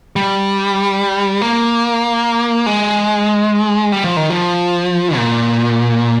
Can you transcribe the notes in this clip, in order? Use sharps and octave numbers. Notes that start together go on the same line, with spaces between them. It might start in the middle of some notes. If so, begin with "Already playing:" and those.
G3
A#3
G#3
G3
F3
D#3
F3
A#2